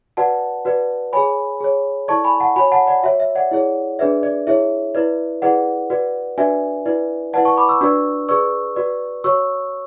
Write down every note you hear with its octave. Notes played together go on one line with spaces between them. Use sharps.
F#4 B4 D5 F#5 A5
F#4 B4 D5
G#4 C#5 G#5 B5
G#4 C#5
E4 A4 D5 A5 C#6
G#5 B5
F#5 A5
F#4 C#5 G#5 B5
F#5 A5
D5 F#5
F#4 C#5 E5
E5
D5 F#5
E4 G#4 C#5
D4 G#4 B4 D5 E5
D5
E4 G#4 C#5 E5
E4 B4 D5
E4 G#4 B4 D5 F#5
F#4 B4 D5
D4 F#4 B4 D5 E5 G#5
E4 B4 D5
E4 B4 D5 F#5 A5
A5 C#6
B5 D6
C#6 E6
D4 F#4 B4 D5 C#6 E6
G#4 B4 D5 C#6 E6
F#4 B4 D5
F#4 C#5 C#6 E6